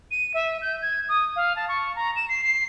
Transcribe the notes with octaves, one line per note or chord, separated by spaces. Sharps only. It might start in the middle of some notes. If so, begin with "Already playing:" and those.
D#7
E5
G6
G#6
D#6
F5
A5
C#6
A#5
E7
C7
C7